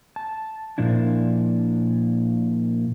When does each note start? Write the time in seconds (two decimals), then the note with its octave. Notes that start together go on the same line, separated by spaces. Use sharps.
0.16 A5
0.78 A#2 F3 D4 E4